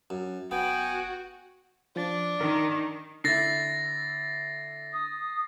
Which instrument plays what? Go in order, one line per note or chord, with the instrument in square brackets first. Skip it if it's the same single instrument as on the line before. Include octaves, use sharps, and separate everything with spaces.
[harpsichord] F#2
[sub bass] G1 [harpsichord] B3 [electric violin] F#4 [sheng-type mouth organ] G5 G#5
[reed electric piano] F3 A6 [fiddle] D4
[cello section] D#3 [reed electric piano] A#4
[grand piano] D3 E4 [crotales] A6 A#6 C7
[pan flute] D#6